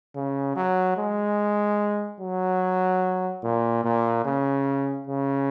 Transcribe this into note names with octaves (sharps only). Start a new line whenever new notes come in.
C#3
F#3
G#3
F#3
A#2
A#2
C#3
C#3